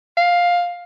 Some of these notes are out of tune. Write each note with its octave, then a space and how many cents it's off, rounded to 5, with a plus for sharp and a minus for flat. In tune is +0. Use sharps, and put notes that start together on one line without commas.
F5 +10